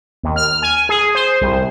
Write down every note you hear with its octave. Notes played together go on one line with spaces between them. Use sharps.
D#2
F6
G#5
G#4
C5
C2